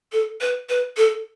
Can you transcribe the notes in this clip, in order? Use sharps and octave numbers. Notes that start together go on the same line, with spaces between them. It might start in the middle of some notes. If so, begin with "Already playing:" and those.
A4
B4
B4
A4